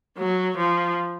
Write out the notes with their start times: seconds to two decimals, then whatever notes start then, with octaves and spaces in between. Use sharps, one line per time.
0.18 F#3
0.57 F3